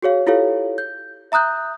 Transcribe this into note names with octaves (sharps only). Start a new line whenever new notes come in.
F#4 G#4 C#5 F5
E4 F4 G4 A4 C#5 F5
G6
E5 A#5 D#6 F#6 G6